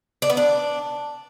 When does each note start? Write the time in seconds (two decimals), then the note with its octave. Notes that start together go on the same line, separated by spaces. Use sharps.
0.22 D4
0.30 B3
0.37 D4